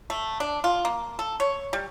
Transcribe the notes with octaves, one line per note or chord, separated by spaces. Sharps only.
A3
D4
F4
A#3
A4
C#5
G3